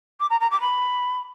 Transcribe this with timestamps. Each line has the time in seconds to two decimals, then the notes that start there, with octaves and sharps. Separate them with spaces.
0.20 D6
0.30 A#5
0.40 A#5
0.51 D6
0.61 B5